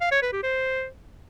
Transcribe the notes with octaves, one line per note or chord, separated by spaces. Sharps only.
F5
C#5
B4
G4
C5